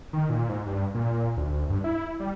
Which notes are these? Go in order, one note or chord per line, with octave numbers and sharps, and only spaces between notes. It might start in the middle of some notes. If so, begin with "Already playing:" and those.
D#3
A#2
G#2
G2
A#2
D2
G2
E4
G3